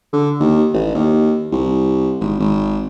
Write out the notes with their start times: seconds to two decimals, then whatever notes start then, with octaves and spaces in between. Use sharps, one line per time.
0.13 D3
0.40 D#2
0.74 A1
0.95 D#2
1.52 C2
2.20 G#1
2.40 G#1